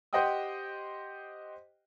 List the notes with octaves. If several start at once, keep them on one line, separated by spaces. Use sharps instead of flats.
G4 C5 D#5 F#5 G5 D#6